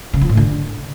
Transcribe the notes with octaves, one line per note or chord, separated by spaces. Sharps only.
C#3
F3
A2
D3